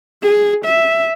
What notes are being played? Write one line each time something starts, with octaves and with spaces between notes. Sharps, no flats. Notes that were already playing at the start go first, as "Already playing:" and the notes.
G#4
E5